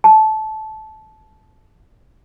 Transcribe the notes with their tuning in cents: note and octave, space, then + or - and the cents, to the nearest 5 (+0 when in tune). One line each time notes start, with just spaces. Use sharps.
A5 -20